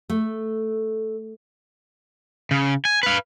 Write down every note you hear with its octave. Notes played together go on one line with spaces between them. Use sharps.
A3
C#3
G#5
B4 F5